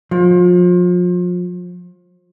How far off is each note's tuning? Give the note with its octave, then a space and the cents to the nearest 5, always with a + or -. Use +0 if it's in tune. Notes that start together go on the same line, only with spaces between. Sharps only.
F3 +35